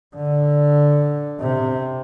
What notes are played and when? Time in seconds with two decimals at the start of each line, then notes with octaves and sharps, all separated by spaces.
0.16 D3
1.40 C3